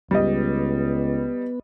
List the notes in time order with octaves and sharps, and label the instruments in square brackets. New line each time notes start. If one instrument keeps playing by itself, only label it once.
[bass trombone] C#2 [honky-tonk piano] G3 D#5 [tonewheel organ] B3